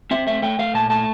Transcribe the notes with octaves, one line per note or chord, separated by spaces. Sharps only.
C4 E5
A3 E5
A3 G5
A3 F5
A#2 A5
A3 A5